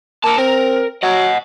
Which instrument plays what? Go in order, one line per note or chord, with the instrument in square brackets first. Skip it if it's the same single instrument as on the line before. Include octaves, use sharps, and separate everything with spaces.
[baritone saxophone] A#3 [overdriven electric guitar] A#4 A5
[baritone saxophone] C4 [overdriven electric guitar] A#4
[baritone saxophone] F#3 [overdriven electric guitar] D#5 F#5